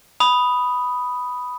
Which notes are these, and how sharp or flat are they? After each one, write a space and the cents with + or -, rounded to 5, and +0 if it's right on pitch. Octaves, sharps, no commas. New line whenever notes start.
B5 +0 D#6 +0